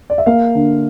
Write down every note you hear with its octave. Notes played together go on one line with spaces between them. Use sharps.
D5
E5
A#3 F5
D3